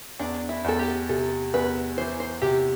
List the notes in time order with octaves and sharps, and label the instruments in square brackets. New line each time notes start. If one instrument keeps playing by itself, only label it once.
[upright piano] E2 [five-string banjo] D4
[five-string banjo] E4
[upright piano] E2 [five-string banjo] A4
[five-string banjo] G4
[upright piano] C3 [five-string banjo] A4
[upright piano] E2 [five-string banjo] B4
[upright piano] E3 [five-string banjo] C5
[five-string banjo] C5
[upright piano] C3 [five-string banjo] G4